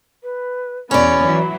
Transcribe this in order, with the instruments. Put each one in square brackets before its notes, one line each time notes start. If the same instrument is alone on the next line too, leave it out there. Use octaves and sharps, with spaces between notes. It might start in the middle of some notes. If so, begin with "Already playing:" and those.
[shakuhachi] B4
[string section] E2 B2 B3 [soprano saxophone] C#4 [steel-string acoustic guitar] C#5 D5 [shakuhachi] B5
[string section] E3 F#3 E4